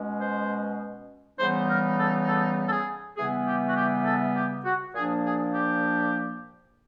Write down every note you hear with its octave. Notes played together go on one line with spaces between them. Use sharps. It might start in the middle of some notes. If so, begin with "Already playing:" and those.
Already playing: B2 G#3 C#4
C5
C#3 E3 G3 B3 D#4 C5
A#4
A4
A4
A4
G#4
C#3 E3 G3 B3 G#4
G4
F#4
G4
A4
G4
F#4
A#2 F3 A#3 D4 G#4
G#4
G4